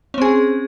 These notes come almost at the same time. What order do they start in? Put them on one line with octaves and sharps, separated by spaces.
C#4 C4 G#4